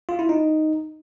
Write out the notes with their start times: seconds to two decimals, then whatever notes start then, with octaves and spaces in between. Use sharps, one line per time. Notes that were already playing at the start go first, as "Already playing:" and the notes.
0.09 F4
0.19 E4
0.29 D#4